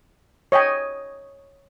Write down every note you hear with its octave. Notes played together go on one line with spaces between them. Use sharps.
C#5 D#5 G5 G#5